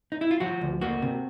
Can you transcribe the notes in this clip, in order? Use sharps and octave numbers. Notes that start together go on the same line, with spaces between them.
D#4
E4
F4
F3 F#4
D2
A#3 F#4
C3